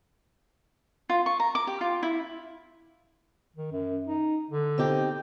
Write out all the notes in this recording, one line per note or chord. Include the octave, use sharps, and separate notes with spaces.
F4
C#6
A#5
D6
G4
F4
E4
D#3
F#2
D#4
D3
C4 D#4 G4